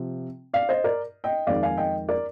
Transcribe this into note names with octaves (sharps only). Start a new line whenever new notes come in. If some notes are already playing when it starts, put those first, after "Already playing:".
Already playing: C3 F3
D5 F5
C5 D#5
A#4 D5
D#5 G5
F2 D#3 G#3 D5 F5
F5 G#5
D#5 G5
A#4 D5